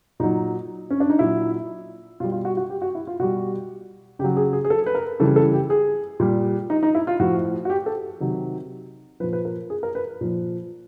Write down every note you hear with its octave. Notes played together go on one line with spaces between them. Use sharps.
A#2 F#3 D#4
C#4
D4
D#4
A#2 F#3 E4
B2 G3 F4
F4
F#4
F#4
G4
F#4
E4
F4
B2 G3 F#4
C#3 F#3 G4
G#4
G#4
G#4
A4
B4
A#4
C#3 E3 G3 A4
A4
G4
G#4
A#2 G3
D#4
D#4
E4
F4
A2 F3 F#4
F#4
G4
A4
C3 D#3 F#3
A#2 F3 B4
B4
A#4
G#4
A#4
B4
A#2 F3